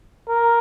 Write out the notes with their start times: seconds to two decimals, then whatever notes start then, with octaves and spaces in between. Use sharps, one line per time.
0.29 A#4